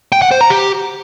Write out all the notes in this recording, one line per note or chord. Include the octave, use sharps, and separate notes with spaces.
G5
F#5
C5
A#5
G4